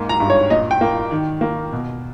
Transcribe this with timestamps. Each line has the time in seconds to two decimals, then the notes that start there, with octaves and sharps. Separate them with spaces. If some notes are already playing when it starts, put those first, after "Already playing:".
Already playing: G#2 A#3
0.09 A#5
0.20 G2
0.30 C#5
0.50 A#2 D#5
0.71 G5
0.81 A#3
1.11 D#3
1.41 A#3
1.73 B2